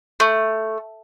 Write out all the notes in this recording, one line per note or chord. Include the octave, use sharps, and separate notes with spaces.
A3